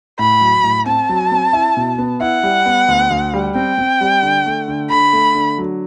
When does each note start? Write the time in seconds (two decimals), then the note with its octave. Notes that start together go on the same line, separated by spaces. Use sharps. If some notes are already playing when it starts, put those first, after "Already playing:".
0.19 A2 B5
0.41 F#3
0.64 A2
0.86 C4 A5
1.09 F#3
1.31 C4
1.53 E4
1.77 B2
1.98 B3
2.21 E4 F#5
2.43 G3
2.66 B3
2.88 D2
3.10 D2
3.34 G3
3.55 C4 G5
3.78 C4
4.01 G3
4.22 D3
4.46 A3
4.68 D3
4.90 D3 B5
5.13 A3
5.35 D3
5.58 F#3